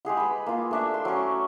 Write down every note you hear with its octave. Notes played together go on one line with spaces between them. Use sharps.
G#3 G4 G#4 F#5
B4 B5
A#3 F4
A3 D4 E5
C6
F#3 C#4